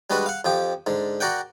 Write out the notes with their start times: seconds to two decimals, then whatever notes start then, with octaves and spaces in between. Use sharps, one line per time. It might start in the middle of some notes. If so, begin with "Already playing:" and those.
0.10 G3 G#3 D4 F#4 B4
0.26 F5 F#5
0.45 F2 F3 G4
0.86 G#2 D3
1.20 F#4 A#4 D5 F#5 G5